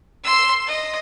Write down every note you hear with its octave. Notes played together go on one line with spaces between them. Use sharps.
C6 E6
D#5